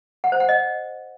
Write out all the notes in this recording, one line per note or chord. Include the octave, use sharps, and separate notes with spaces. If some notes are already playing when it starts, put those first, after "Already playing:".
F#5
C5
F#5
D#5